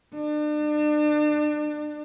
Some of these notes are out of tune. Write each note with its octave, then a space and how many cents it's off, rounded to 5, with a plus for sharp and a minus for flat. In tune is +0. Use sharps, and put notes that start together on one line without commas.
D4 +35